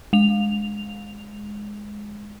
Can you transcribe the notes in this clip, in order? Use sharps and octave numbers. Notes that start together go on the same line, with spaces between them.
G#3 F7